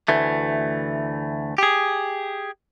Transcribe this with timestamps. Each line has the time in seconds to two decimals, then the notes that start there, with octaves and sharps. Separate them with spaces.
0.08 D2 E3 A3
1.58 G4 G#4